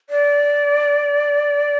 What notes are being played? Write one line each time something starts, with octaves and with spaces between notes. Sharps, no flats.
D5